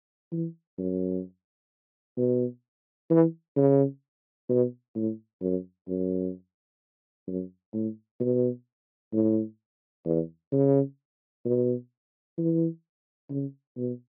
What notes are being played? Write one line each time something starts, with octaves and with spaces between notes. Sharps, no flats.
E3
F#2
B2
E3
C#3
B2
A2
F#2
F#2
F#2
A2
B2
A2
E2
C#3
B2
E3
C#3
B2